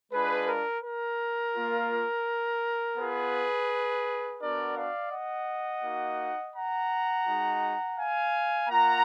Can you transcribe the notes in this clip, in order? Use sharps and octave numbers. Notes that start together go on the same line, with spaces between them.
G#3 D4 F4 G#4 B4
A#4
A#4
A#3 F4
B3 F4 G#4 B4
B3 D4 F#4 A#4 D5
D5 F5
D#5 F#5
A#3 D#4 F#4
F#5 A#5
G#3 D#4 F#4
F5 G#5
A#3 F4 F#5 A#5